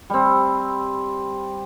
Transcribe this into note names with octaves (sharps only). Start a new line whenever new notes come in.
G3 C4